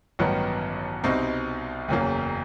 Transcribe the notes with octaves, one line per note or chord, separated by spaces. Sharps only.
A1 G2 D#3 F#3 B3
C2 B2 G3 C4 D#4
F#1 E2 C#3 F#3 A#3